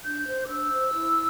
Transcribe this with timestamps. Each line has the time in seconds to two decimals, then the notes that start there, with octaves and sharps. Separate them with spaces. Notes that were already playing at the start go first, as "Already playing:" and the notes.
0.04 D4 G6
0.26 C5
0.45 D6
0.49 D4 E6
0.72 C5
0.94 E4